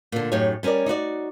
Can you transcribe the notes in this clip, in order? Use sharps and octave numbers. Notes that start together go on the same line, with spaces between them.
A#2 D3
F#2 A2 D#4 G4 C#5
G3 C#4 A4 A#4 D5
D#4 E4 F#4 D5